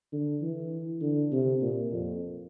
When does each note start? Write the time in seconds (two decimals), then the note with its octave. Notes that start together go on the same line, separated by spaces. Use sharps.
0.12 D3
0.42 E3
1.02 D3
1.32 C3
1.62 A#2
1.92 F2